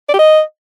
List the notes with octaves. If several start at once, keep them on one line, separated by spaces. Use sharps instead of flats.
D5
G4
D#5